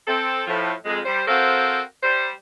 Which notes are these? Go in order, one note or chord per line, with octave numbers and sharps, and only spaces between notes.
C4 A4
A2 F3
F2 G#3
G3 C5
C4 F#4 A4 A#4 C5 F5
G3 C5